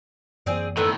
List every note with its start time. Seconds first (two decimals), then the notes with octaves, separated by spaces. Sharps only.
0.46 F#2 E3 A#3 C4 G#4 D5
0.77 A2 D#3 B3 A4 E5